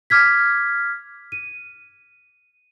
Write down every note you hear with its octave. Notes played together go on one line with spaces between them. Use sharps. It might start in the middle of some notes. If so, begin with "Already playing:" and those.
D6 F6 G#6 B6
D#7